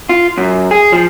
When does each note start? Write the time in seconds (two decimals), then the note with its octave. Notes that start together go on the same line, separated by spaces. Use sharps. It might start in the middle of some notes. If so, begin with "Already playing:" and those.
0.09 F4
0.37 F#2
0.71 G#4
0.92 F3